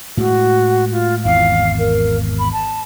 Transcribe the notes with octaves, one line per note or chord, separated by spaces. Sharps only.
A2 G#3 F#4
F4
G#1 E2 E3 F5
A#4
B5
A5